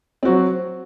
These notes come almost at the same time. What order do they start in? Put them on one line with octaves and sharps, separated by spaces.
C4 F#4 F#3